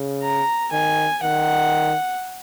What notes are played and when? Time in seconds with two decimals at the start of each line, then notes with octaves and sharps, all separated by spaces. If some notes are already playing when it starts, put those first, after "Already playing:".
Already playing: C#3
0.22 A#5
0.72 D#3 G#5
1.23 D#3 F#5